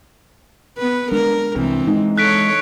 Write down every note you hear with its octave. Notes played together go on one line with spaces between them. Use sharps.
B3 B4
G#3 D4 A#4
C2 C3 E3 C4
G#3 D#4
A4 C#5 F#6 B6 D7